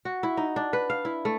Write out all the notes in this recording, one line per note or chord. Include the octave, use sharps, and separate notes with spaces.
F#4
E4
D#4
D4
B4
F5
E4
A3